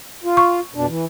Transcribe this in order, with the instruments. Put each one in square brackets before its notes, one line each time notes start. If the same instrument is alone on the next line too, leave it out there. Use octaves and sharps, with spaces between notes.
[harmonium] F4
[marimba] C#6
[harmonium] F2 B2 D4
E3